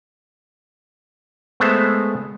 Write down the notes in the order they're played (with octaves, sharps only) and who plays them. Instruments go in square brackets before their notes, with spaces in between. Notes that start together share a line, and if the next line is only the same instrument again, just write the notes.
[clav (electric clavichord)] G#3 A3 B3 C5 E5